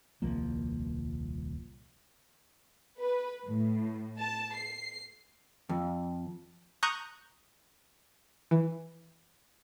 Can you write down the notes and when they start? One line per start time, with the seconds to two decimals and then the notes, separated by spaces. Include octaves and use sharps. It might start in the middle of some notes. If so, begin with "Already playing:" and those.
0.22 D#1 C2 F3 A#3
3.00 B4
3.47 A2
4.19 A5
4.55 C7
5.69 F2
6.83 A#5 C#6 D#6 F#6 G6
8.51 E3